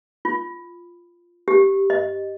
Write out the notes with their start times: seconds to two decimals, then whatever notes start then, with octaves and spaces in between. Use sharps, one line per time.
0.25 F4
1.48 G4
1.90 D#5